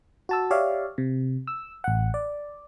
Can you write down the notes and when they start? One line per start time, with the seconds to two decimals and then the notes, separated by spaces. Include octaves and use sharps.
0.29 F#4 A5 E6
0.51 G4 C#5 D5 E5 F5
0.98 C3
1.47 E6
1.84 A1 F#5
2.14 D5